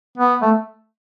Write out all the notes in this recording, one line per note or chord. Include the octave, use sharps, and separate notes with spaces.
B3
A3